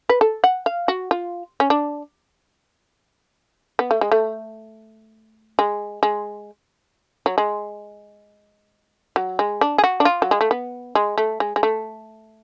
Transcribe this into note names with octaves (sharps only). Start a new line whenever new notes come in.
B4
A4
F#5
F5
F#4
F4
C#4
D4
B3
A3
G#3
A3
G#3
G#3
F#3
G#3
F#3
G#3
D4
G#4
F#4
D4
F4
F#3
G#3
A3
B3
G#3
A3
G#3
G#3
A3